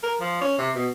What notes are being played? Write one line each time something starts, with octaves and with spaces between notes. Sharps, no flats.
A#4
F3
C#4
C3
B2